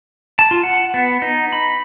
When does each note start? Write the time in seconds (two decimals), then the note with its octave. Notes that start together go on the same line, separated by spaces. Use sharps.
0.39 A5
0.51 F4
0.63 F#5
0.94 B3
1.22 D#4
1.53 B5